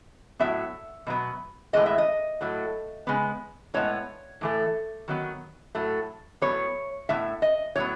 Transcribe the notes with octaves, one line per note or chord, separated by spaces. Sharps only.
A2 F#3 B3 E5
B2 F#3 B3
A2 E3 G#3 B3 D#5
E5
D#5
A2 F#3 A3
C#3 G#3 B3
A2 G#3 B3 C#5
A2 E3 A3
D#3 F#3 B3
A2 F#3 A3
A2 F#3 B3 C#5
A2 G#3 B3 E5
D#5
A2 F#3 B3 C#5